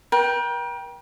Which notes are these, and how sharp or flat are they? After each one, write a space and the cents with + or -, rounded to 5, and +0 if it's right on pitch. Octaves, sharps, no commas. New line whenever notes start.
A#4 +45 G5 +0